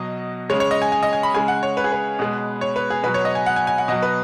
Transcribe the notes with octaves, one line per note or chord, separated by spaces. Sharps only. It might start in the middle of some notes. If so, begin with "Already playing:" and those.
Already playing: B2 F#3 D#5
C#3 G#3 C#5
C#5
D#5
G#5
G#5
D#5
G#5
B5
C#3 G#3 G#5
F#5
C#5
B4
G#4
B4
B2 G#3
C#5
B4
G#4
B2 F#3 B4
C#5
D#5
G#5
F#5
G#5
G#5
F#5
B2 F#3 D#5
B4